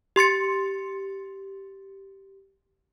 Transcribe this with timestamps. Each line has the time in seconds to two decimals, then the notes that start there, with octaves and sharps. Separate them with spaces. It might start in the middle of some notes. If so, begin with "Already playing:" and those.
0.16 G4 C6 A6 C#7